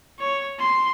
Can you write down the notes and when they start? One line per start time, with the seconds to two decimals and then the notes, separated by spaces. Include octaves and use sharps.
0.20 C#5
0.59 C6